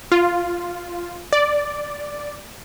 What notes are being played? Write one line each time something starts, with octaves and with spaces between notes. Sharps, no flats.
F4
D5